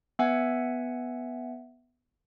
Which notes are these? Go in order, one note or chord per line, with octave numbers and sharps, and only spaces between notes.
B3 E5 F#5 G#5